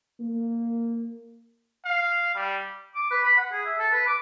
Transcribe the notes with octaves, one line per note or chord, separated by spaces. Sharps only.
A#3
F5
G3
D6
B4
B5
F#5
G#4
E5
A4
B4
D6